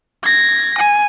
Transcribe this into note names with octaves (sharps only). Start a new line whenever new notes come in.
G#6 A#6
G#5